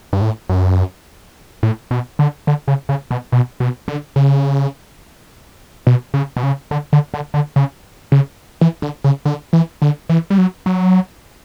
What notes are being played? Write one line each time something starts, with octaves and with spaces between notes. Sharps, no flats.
G2
A2
F#2
A2
B2
D3
D3
C#3
C#3
B2
B2
B2
D3
C#3
B2
C#3
B2
C#3
D3
D3
D3
D3
C#3
C#3
E3
D3
C#3
D3
E3
D3
E3
G3
F#3
F#3